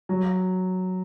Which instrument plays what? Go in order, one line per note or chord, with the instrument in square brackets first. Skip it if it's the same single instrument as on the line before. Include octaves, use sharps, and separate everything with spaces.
[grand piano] F#3